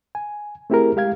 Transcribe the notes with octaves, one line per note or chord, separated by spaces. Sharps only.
G#5
A3 C4 E4 G4 G#4 A#4
G#3 G4 F5 G#6